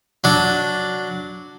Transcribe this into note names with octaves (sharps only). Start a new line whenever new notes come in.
F#3 D4